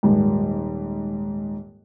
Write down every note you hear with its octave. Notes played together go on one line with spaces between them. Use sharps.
D#1 G#2